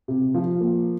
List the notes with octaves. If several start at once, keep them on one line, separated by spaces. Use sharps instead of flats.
C3
F3
A#3